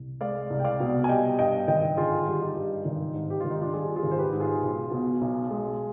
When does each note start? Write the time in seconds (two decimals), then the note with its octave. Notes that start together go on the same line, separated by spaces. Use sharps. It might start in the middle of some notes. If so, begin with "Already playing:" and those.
Already playing: C2
0.21 G#3 D5 F5
0.50 C2
0.60 G5
0.64 D5 F5
0.80 B2
1.04 G#5
1.09 G3 D#5 G5
1.39 G2 D#5 G5
1.68 G#1 D#5 G5
1.97 D3 F4 G#4
2.27 G3
2.41 D#4 G4
2.56 G2
2.85 G#1 D#4
3.15 G#2
3.30 G4
3.40 G#1 F4
3.51 D#4
3.61 D4 F4
3.74 G3 F4 G#4
3.96 F4 G#4
4.03 G#1
4.11 C5
4.18 G4 B4
4.33 G#2
4.40 F4 G#4
4.62 B1
4.91 B2
5.21 B1
5.51 G#3